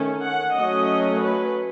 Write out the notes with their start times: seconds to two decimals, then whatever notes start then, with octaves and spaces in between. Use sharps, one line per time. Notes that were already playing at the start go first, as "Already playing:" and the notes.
Already playing: D#3 A3 C#4
0.25 F#5
0.56 F#3 A3 C#4 D#5
1.19 B4